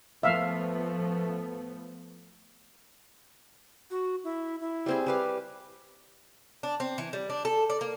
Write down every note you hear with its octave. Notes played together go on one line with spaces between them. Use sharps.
F3 A3 B3 E5 F5
F#4
E4
E4
G3 C4 G#4
G3 G4 B4 F5
D4
C4
E3
G3
D4
A4
D5
A#3